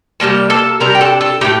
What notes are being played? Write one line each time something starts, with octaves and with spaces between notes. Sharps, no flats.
C3 G3 A#3 A5
A4 A5
C3 G3 D4 A#4 A#5
G5
A4 A5
A4 A5
A2 A3 D#4 G4 G5